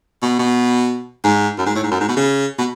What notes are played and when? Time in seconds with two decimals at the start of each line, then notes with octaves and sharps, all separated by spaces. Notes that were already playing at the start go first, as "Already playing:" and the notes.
0.22 B2
0.39 B2
1.24 G#2
1.58 F#2
1.66 G#2
1.75 A2
1.83 G#2
1.91 F#2
2.01 G#2
2.09 B2
2.17 C#3
2.59 B2